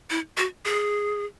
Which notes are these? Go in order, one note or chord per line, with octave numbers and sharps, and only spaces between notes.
E4
F#4
G#4